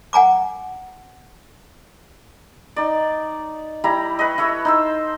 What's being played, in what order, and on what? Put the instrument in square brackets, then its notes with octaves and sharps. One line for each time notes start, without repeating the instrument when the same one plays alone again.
[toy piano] F#5 G#5 A#5 D6
[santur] D#4 D5
G3 E4 A#5 B5
B4 C#5 D#5
E4 A4 C#5 E5
D#4 C5 E6